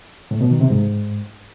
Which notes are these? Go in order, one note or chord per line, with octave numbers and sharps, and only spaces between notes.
A2
B2
D#3
C3
G#2